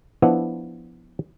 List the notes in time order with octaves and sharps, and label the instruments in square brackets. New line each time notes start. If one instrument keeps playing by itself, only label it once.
[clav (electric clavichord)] F3 B3 D4 E4